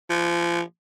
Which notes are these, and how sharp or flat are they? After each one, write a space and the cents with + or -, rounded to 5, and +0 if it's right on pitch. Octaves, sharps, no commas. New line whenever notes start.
F3 -30